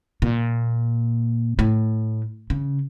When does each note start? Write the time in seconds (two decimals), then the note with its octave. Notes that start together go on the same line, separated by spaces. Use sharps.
0.22 A#2
1.59 A2
2.50 C#3